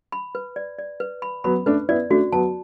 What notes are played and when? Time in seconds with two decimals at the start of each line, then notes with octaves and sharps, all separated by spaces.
0.12 B5
0.35 B4
0.56 D5
0.78 D5
1.00 B4
1.22 B5
1.44 F#3 B3 B5
1.66 A3 D4 B4
1.89 B3 E4 D5
2.10 A3 D4 F#4
2.32 F#3 B3 A5